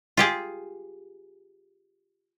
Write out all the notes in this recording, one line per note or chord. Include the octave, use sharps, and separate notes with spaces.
F4 G4 G#4